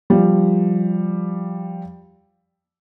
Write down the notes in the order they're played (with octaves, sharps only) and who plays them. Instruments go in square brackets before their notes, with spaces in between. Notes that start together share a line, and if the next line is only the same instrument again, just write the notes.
[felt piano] F3 G3